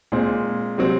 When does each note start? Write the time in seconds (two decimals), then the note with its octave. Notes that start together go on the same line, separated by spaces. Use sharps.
0.12 A#2 G#3 C4
0.78 C3 F#3 C4